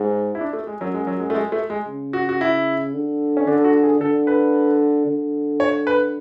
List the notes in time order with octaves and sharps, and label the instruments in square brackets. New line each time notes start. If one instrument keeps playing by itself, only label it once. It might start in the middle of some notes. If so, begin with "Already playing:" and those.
Already playing: [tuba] G#2
[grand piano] E4
D4
A3
G#3
[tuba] F#2 [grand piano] F#3
[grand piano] G#3
F#3
G#3
A3
G#3
A3
G#3
[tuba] C#3
[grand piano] F#4
F#4
E4
[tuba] D3
[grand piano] C#4
[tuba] D3 [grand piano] D4
[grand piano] F#4
G#4
[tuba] D3 [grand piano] A4
[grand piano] B4
[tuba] D3
[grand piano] C#5
B4